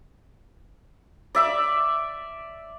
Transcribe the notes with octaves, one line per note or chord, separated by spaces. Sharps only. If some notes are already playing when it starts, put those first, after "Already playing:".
D5 E5 D6